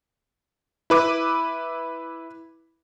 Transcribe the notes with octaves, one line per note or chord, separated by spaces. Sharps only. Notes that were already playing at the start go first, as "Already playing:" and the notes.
E4 B4 D6